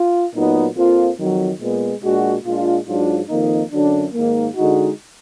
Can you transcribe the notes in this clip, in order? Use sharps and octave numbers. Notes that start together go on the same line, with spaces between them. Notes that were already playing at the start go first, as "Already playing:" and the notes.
Already playing: F4
A#2 F#3 B3 D#4
F2 F3 A#3 F4
F2 D#3 F#3
A#2 G#3 B3
A#2 G#3 D4 F#4
A#2 G#3 D4 F4
G#2 F#3 D4 F4
F2 D#3 A#3 D#4
F#2 D3 F#3 D4
G#2 D#3 A#3
D3 G#3 D#4 F#4